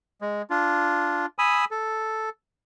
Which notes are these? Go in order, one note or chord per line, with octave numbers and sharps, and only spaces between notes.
G#3
D4 F4
G#5 B5 D#6 E6
A4